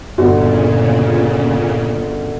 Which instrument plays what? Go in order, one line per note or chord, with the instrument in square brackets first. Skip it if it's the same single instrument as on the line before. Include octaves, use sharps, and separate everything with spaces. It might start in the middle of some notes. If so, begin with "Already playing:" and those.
[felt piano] G1 F#4 [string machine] A#2 C#3